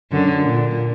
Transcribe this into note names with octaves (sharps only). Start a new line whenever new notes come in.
F#2 D3
A#2